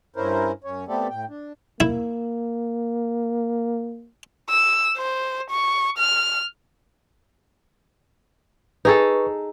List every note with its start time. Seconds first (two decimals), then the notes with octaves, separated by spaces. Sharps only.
0.16 G2 C#4 E4 A#4 C5
0.64 F#2 C#4 C#5
0.88 A3 B3 C4 G4 A4 D5
1.10 A2 G5
1.29 D4
1.80 A#3 E4
4.50 E6
4.97 C5
5.50 C#6
5.98 F6
8.85 D#4 G#4 A4 B4 C#6